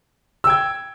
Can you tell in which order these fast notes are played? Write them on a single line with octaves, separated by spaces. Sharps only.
E6 G5 G#6